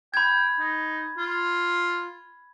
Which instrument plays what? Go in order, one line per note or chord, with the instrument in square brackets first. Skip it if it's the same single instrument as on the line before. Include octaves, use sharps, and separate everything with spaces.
[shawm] G5 [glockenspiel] B5 G#6
[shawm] D#4
F4